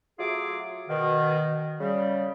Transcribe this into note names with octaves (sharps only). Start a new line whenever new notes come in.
F#3 A3 F4 G#4 D6
B2 D#3
C#3 G3